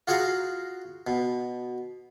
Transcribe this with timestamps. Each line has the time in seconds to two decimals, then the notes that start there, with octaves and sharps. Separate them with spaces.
0.07 F4 F#4 G#4 F5 F#5 A#5
1.07 B2